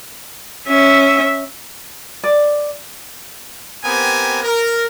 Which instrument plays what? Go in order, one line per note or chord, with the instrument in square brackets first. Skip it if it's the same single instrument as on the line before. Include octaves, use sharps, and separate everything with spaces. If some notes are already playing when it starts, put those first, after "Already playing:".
[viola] C#4 E5
[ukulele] D5
[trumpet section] B3 C4 G4 A#4 G#5
A#4